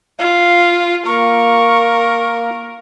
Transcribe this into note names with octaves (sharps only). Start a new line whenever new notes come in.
F4 F5
A#3 A#4 C#6